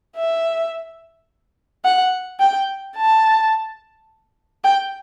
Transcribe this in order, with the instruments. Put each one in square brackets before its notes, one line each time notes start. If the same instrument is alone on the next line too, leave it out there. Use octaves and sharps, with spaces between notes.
[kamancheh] E5
F#5
G5
A5
G5